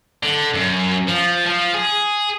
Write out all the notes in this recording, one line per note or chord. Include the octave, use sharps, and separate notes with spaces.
D3
F#2
F3
F3
G#4